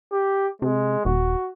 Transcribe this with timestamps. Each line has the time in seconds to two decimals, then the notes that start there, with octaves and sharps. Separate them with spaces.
0.12 G4
0.62 C3 G#3
1.05 D#1 F#4